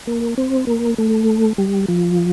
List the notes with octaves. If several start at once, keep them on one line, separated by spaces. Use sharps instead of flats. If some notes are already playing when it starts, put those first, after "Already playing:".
A#3
C4
A#3
A3
G3
F3